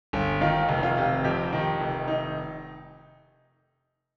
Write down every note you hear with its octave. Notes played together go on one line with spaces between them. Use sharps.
G1
D#3 F4
F1
F4
C3
F2 G4
D#3
F1
D#4